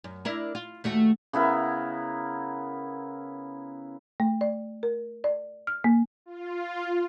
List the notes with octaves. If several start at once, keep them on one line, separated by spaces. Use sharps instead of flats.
F#2
D4 E4 A#4
F4
D#2 A3 F#4
C#3 B3 E4 A#4
A3
D5
A#4
D5
F6
A#3
F4